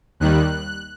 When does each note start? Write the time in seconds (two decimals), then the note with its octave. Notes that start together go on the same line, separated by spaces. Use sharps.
0.20 D#2 D#3 G3 F#6